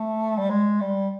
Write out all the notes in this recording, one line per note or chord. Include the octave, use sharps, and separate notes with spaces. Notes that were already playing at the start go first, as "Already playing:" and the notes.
Already playing: A3
G3
G#3
G3